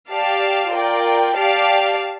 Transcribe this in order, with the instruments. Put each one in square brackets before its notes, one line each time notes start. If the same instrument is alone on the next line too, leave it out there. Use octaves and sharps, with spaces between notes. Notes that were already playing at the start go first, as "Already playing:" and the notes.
[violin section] G4 D5 F5 A5
F4 A#4 D5 G5
G4 D5 F5 A5